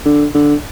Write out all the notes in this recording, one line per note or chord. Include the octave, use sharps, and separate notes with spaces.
D3
D3